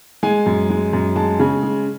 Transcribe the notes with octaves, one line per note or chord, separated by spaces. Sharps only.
G#3 G#5
F#2
G#3
F#2
G#3 A5
C#3 G#5
G#3